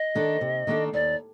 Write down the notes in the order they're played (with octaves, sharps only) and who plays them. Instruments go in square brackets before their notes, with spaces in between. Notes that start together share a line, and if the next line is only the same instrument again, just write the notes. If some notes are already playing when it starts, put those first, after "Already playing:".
Already playing: [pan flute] D#5
[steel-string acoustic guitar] D#3 A#3 D4 A4
C3
D#3 A#3 D4 A4
[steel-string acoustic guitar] D#2 [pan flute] D5